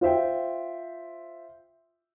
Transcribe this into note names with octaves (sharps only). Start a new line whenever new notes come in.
F4 C5 E5 G5